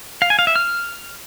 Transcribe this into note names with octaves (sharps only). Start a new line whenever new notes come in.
F5
G#5
F5
E5
F6